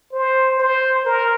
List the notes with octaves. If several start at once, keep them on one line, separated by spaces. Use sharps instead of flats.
C5
C5
A#4